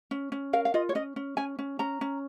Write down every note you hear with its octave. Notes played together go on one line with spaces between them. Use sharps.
C#4
C#4
A#4 F5
F5
F4 D#5
C#5
C#4 D#5
C#4
C#4 G#5
C#4
C#4 A#5
C#4